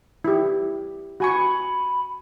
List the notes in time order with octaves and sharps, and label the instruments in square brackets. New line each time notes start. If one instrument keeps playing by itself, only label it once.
[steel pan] E4 G4
[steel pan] F#4 G#5 C#6 [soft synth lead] B5